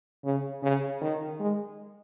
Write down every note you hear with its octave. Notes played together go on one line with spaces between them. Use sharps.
C#3
C#3
D#3
G#3